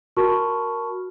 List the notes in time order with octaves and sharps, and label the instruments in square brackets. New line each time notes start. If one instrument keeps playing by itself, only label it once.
[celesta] F#4 A#4 A5 B5 C#6 F6